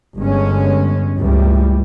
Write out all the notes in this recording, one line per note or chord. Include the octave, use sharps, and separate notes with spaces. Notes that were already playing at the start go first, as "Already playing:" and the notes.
G1 G#3 C#4
C#2 A2 E3 G3